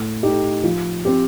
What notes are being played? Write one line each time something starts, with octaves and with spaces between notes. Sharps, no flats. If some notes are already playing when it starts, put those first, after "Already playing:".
Already playing: A2
A3 D#4 G4
F3
C4 G4